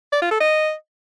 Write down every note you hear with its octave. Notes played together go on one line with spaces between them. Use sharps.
D5
F4
A4
D#5